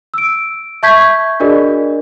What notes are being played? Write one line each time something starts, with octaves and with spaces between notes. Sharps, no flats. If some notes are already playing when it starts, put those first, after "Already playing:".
E6 D7
E5 A5 C#6 G6 G#6 B6
D4 F#4 G#4 A#4 D5 D#5